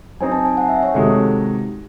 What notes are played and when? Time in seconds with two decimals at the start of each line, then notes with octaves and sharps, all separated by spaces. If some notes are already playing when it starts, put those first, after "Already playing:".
0.20 F#3 C4 D#4 G#5
0.32 A5
0.45 G#5
0.57 F#5
0.69 E5
0.83 C#5
0.94 C3 D#3 G#3 D#4 F#4 A4